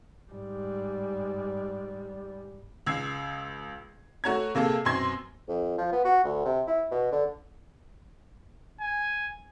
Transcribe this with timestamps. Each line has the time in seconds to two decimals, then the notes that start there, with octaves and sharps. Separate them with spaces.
0.31 G#2 G3
2.86 C#2 E6 G#6 C7
4.24 A3 F#4 C#5 A#5 G#6
4.55 C3 A#3 G#4 A4
4.85 F#2 B2 C4 C6 G#6 A#6
5.48 F2
5.78 F3
5.92 B3
6.05 F#4
6.24 D2
6.45 C3
6.67 E4
6.91 B2
7.12 D3
8.81 G#5